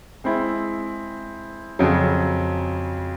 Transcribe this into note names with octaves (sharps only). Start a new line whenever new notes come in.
G#3 C4 E4
F2 C#3 F#3